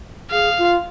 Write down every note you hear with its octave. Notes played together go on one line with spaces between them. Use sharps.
G#4 F5
F4